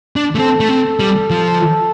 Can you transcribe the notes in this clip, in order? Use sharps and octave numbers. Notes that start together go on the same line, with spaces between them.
D4
A3
C4 A4
A3
C4
G3
F3